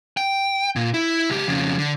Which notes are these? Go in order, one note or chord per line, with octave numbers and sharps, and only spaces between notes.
G5
A#2
E4
C#2 G4
F2 C#3
D3